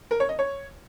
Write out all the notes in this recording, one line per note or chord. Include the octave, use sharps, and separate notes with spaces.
A#4
C#5
D#5
C#5